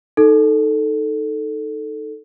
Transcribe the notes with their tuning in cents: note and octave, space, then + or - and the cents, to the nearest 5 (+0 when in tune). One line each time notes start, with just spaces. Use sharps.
D#4 +0 A4 +0